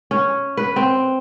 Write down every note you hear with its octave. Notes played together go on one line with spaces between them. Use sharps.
C#4
B4
C4